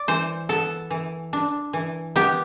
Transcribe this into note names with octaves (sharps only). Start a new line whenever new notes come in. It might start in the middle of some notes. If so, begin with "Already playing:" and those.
Already playing: D5
E3 C5
B3 A4
E3
D4
E3
B3 G4